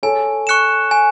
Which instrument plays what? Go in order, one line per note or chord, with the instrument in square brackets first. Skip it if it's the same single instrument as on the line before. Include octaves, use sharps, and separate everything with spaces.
[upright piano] A4 C#5 [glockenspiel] G#5
[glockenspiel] C#6 F#6 C#7 E7
G#5